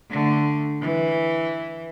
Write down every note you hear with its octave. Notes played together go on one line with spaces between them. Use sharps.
D3 A3
E3